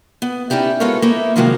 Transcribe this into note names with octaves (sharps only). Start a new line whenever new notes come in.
B3
C#4 D#4 E4 G4 D5
G#3 B3 F4 A4 A#4 C#5
A#3 D#4 E4
C3 D#3 F3 F#3 G#3 A#3